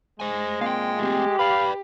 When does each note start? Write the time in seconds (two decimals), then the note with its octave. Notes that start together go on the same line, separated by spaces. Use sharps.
0.20 G#3 C5 G#5
0.61 A#2 C4 F5 G5
0.99 A3 C4 G4
1.39 B4 D5 F5 B5